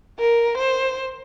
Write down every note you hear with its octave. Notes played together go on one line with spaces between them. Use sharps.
A#4
C5